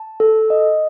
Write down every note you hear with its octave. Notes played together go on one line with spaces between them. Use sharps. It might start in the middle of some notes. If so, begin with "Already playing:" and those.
Already playing: A5
A4
D#5